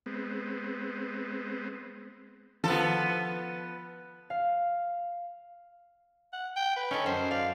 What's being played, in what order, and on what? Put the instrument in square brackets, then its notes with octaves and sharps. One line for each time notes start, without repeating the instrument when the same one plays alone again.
[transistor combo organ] G#3 B3 C4
[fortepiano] F3 [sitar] B3 A4
[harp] F5
[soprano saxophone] F#5
G5
B4
[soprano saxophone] C#4 [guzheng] D#4 A4
[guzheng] F#2 [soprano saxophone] C5
[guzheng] D5 [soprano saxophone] F5